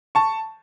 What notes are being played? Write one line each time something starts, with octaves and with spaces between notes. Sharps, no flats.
A5 C#6